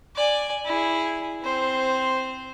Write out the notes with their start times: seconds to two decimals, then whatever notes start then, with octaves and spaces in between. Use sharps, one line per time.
0.16 D5 G#5
0.65 E4 G#4
1.43 C4 C5